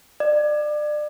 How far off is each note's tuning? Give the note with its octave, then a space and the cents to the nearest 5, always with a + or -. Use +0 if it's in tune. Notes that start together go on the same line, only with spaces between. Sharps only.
D5 +30